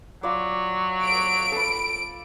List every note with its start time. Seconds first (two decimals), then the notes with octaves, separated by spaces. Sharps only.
0.23 F#3 F4 D5
1.05 D7
1.52 A4 B5